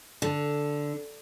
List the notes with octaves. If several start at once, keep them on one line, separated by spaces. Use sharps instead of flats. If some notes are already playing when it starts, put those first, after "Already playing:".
D3